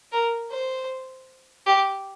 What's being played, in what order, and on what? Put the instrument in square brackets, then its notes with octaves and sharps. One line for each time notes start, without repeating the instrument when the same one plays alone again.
[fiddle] A#4
C5
G4